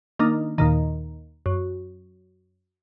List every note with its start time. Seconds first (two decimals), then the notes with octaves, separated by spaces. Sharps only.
0.19 D#3 A#3 D4 D#4
0.58 D#2 A#2 D#3
1.46 F#2